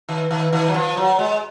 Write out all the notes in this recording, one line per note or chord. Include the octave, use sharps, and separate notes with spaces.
D#3
D#3
D#3
F#3
F3
F#3
G#3